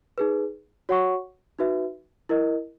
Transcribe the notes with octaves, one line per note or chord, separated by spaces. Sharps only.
D#4 G#4 B4
F#4 C#5 F#5 C#6
D#4 F#4 B4 E5
E4 A#4 D#5